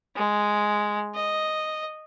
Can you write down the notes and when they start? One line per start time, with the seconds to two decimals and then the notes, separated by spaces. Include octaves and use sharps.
0.16 G#3
1.15 D#5